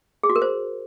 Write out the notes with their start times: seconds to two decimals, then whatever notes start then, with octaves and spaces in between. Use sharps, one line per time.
0.23 G#4
0.30 F#4
0.36 A#4
0.42 C5